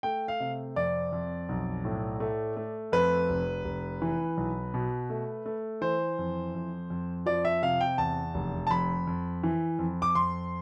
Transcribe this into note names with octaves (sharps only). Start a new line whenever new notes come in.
A3 G5
F5
C3
F2 D5
F2
B1
A2
A3
A3
F2 B4
F1
F1
E3
B1
B2
A3
A3
E3 C5
F2
F2
F2
F3 D5
E5
C3 F5
G5
E2 A5
F1
A5
F2 B5
F2
E3
F2
D6
F2 C6